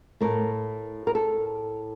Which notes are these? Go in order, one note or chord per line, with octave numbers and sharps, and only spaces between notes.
A2 A3 A#4
A#4
A4